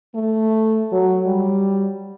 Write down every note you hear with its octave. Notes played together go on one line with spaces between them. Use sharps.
A3
F#3
G3